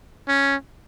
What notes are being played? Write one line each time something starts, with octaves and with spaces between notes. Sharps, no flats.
C#4